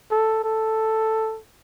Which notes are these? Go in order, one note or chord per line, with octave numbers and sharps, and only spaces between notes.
A4
A4